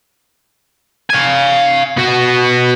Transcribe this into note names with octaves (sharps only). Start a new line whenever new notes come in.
F5 G#5
B3 F#4